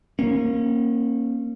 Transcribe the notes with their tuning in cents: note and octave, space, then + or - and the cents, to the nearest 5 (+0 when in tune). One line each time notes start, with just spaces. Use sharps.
A#3 +0 C#4 -30